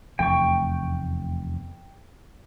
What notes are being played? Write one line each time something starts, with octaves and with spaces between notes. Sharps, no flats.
F1 E2 A3 G5 C#6